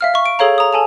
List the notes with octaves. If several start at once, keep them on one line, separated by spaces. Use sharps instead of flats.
E5 F5 F6
E5 C#6
D7
G#4 A4 C#5 F5 A#5
A#5 D#6
A4 G#5 A5 F7